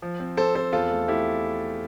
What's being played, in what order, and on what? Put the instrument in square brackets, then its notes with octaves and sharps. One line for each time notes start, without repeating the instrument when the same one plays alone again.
[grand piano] F3
C4
C4 A4 C5
C4 A4 C5
E2 F4 A4
A3
A3 E4 G4